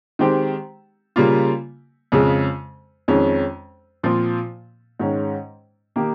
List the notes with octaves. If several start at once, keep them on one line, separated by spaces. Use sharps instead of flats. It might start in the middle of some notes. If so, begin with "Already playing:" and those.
D#3 G#3 C4 G4
C#3 G3 A#3 F4
F2 C#3 G#3
F2 D#3 G#3 C#4
A#2 F3 C4 F4
G#2 D#3 G#3 C#4
D#3 A#3 D#4 G4